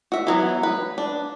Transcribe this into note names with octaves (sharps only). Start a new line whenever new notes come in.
F#4 E5
E3 F#3 B3
B4
D4